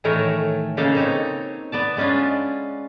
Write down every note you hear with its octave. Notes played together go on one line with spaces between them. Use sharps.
A2 D#3 E3 A3 A#4 C#5
C#3 A#3 D#4 A4
C4 D#4 C#5
B3 D5 A5
G#3 B3 C#4 D4 F4